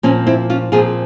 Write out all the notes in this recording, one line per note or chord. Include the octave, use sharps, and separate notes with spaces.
A#2 F3 C4 C#4
C4 E4
C#4 F4
A#2 F3 C4 F4 G#4